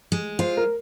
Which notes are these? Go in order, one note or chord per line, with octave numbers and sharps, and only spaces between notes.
G#3
F4 C5
A#4